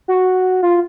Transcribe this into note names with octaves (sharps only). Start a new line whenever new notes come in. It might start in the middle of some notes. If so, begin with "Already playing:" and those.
F#4
F4